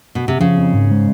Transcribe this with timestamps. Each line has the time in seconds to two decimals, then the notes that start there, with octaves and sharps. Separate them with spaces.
0.15 B2
0.28 C3
0.40 C#3 F3
0.58 C4
0.73 G#2
0.91 G#3